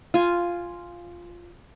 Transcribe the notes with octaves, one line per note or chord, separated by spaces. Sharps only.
F4 G#5